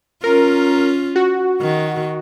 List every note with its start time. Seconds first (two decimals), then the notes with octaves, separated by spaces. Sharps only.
0.23 C#4 F4 A#4
1.16 F#4
1.61 D#3